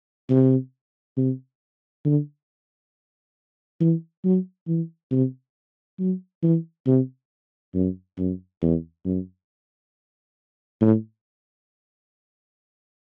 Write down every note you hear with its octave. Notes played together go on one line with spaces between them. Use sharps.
C3
C3
D3
E3
F#3
E3
C3
F#3
E3
C3
F#2
F#2
E2
F#2
A2